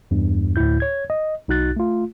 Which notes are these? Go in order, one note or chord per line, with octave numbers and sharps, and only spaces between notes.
E2 G2
D2 A2 E4 G6
C#5 G#6
D#5
B1 D#4 F#4 F#6 A6
A3 F4